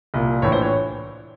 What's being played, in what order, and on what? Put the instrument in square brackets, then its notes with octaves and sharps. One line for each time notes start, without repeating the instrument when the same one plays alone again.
[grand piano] C2 A#2
A#1 A2 E3 C#5
C5
C#5